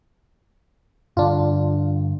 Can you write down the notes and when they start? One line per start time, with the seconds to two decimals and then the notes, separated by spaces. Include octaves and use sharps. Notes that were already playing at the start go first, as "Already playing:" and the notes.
1.17 G2 D3 D4 F4